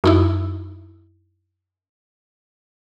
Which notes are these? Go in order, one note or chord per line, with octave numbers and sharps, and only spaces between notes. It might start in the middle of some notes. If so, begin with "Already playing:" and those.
F#2 D#4 E4